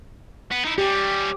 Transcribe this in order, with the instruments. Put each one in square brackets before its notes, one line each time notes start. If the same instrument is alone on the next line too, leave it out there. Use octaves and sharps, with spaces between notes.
[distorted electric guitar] B3
D#4 E4
[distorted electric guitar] G3 C#4 [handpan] G4